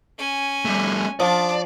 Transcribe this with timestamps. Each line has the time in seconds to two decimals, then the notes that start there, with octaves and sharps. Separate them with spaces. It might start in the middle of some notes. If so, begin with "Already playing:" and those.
0.18 C#4 G#5
0.65 G3 A3
1.20 F3 D4 D5 A5